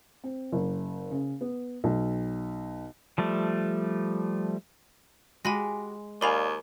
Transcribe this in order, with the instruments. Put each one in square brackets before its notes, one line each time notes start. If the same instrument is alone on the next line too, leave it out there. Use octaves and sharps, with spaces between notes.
[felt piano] C4
F#1
C#3
B3
B1
[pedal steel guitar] F3 G3 A3
[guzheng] G#3 [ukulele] F#4 G4 [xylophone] G#5 B5 A#6
[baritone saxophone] D#2 [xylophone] A#4 B5 F7 [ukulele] D5 F5 G#5